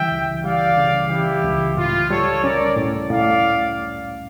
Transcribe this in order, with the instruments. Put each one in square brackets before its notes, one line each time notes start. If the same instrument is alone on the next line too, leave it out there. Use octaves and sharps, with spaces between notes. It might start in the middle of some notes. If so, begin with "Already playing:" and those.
Already playing: [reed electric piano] C#3 E3 G3 [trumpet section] E5 G5
[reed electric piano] C#2
[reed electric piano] G3 [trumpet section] D5 F5
[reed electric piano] C#3
[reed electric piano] E3 [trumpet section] E4 G4
[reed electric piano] C#2
[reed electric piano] A2 [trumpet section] F4
[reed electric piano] G3 [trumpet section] A4 C#5
[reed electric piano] C#4 [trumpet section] A#4 D5
[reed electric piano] A2
[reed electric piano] A2 [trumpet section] D5 F5